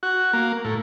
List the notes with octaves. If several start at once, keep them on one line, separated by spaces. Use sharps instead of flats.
F#4
A#3
A2